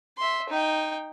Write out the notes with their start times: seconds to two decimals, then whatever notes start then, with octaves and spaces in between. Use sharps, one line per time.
0.18 E5 C6
0.49 D#4 G5